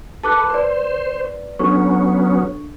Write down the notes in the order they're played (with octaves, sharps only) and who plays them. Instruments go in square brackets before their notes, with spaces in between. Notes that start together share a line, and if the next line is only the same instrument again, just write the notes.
[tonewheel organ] A4 B4 [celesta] A5 D6 F#6
[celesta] B4 D5 [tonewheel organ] C5
[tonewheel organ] F#3 B3 C#4 [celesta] D4 A4 C#6